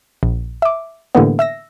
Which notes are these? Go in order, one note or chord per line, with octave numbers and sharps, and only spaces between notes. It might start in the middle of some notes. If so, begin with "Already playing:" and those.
A#1
E5 D6
A2 D3 E3 G3 A#3 B3
E5 E6 A#6